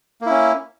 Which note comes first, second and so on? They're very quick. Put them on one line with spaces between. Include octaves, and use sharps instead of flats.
A#3 E4 C#4